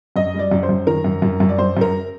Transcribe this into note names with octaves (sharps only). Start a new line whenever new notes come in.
F#2 D#5
G3 D5
F#2
C5
F#2
D#3 A#4
F#2
F#2
F#2
D5
F#2 C5
F#2 A#4